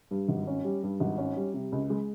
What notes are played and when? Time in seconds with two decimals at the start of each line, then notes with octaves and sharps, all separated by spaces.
0.11 G2
0.28 G#1
0.47 C#4
0.64 G3
0.83 G2
1.00 G#1
1.18 C#4
1.37 G3
1.54 C3
1.72 C#2
1.90 G#3